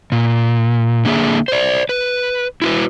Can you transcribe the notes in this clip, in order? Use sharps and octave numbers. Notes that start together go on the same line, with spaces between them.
A#2
D3 A#3 G#4 E5
C5 D5
B4
E4 F#4 B4